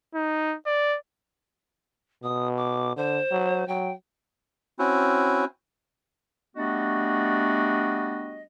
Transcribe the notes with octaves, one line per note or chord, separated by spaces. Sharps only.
D#4
D5
B2 D#6
D6
D3 C5
F#3
F#3 G5
C4 C#4 E4 F#4
G3 A3 B3 D4 F#4 D#5